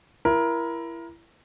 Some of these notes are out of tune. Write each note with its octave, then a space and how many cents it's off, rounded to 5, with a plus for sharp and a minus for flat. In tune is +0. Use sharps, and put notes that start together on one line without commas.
E4 +25 A#4 +20